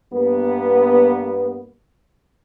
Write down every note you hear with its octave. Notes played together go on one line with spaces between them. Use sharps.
G2 A#3 B3